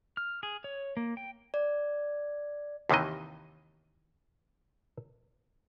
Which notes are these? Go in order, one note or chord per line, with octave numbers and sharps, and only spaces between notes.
F6
G#4
C#5
A#3
G5
D5
D#2 C3 D#3 E3 D#5